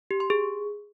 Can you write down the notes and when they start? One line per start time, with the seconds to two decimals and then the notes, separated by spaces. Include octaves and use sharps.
0.11 G4
0.20 C6
0.30 G#4